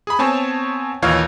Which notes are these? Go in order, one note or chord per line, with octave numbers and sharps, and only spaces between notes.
G#4 B5
B3 C4 C#5 G#5 A5
D#2 A#2 E3 C#5 D#5 F5